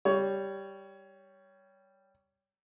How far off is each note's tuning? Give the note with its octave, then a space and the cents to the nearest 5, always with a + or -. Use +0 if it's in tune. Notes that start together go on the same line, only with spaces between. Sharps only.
G3 +0 C#5 +15